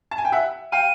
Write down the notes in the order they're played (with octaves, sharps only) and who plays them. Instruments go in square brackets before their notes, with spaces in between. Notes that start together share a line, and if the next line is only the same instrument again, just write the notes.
[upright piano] A5
G#5
G5
E5 F#5
[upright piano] F5 G5 [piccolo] D#7